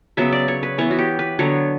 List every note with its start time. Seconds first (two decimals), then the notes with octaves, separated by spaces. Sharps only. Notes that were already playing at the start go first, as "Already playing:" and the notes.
0.17 C#3 F#3 B3 E5
0.32 D5
0.48 C#5
0.63 B4
0.78 E3 B3 C#5
0.91 F#4
0.98 G4
1.19 B4
1.39 D3 F#3 B3 C#5